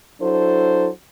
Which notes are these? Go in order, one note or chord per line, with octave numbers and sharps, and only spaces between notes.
F#3 D4 E4 A4 C5